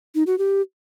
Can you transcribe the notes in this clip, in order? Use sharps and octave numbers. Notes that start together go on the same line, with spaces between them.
D#4
F#4
G4